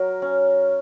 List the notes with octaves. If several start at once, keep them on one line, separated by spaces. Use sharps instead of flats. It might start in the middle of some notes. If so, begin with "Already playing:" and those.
Already playing: F#3 A#4
C#4